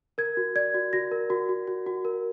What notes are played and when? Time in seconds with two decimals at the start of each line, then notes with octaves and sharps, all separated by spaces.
0.18 A#4 G#6
0.37 F#4
0.56 D5 G#6
0.74 F#4
0.93 F#4 A#6
1.11 A#4
1.30 F#4
1.49 F#4
1.67 F#4
1.86 F#4
2.05 A#4